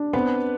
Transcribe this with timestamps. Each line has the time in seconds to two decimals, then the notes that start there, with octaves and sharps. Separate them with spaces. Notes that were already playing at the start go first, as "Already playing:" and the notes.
Already playing: D4
0.13 B3 C4 B4